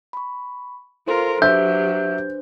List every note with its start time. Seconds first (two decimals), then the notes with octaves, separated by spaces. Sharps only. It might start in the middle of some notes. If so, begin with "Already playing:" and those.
0.13 B5 C#6
1.07 F4 A4 A#4 C5 C6
1.42 F#3 D4 G4 B4 C5 E5 G6